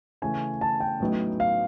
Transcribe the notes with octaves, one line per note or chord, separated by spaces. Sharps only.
C#3 E3 A3 C#4 G#5
A5
G5
A1 A2 F#3 B3 D#4
F5